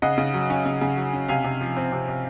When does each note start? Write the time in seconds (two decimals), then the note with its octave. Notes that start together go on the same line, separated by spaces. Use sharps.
0.02 C#3 D#5 F#5
0.18 C#3
0.34 F#3
0.50 C#4
0.66 C#3
0.81 C#3
0.97 F#3
1.13 C#4
1.28 C3 F5 G#5
1.44 C3
1.61 F3
1.77 C4
1.92 C3
2.08 C3